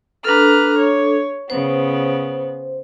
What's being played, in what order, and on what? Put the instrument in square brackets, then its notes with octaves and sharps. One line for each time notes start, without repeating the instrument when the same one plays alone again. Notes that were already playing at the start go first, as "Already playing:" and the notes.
[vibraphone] D4 A4 [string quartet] B4 A#5 F6
[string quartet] C#5
[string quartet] C#3 B3 [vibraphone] C5